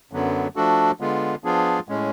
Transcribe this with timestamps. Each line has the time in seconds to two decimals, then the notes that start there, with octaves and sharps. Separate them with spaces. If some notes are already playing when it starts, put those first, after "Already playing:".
0.12 F#2 D3 F#3 B3
0.56 F3 A3 D4 F#4 A4
1.00 D3 G#3 B3 F4
1.44 F3 B3 D4 F4 G#4
1.89 A2 G#3 C#4